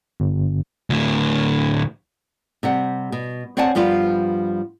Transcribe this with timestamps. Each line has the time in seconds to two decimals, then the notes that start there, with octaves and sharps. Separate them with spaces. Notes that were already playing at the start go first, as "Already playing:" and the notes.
0.20 G1
0.90 D2 A2
2.63 C3 G3 F#5
3.12 B2
3.57 C4 C#5 D5 F#5 G#5 A5
3.75 G2 F3 G3 B3 F4